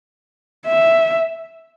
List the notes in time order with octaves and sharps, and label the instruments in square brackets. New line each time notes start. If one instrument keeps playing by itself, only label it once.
[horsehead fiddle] E5